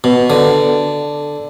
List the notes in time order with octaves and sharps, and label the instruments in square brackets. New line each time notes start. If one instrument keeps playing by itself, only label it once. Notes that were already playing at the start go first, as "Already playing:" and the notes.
[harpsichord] B2
D3